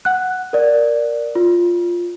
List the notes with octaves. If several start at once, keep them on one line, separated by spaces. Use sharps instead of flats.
F#5 F#6
A#4 D5
F4